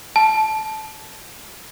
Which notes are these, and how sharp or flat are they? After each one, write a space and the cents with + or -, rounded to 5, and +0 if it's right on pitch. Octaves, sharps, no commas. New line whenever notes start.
A5 -15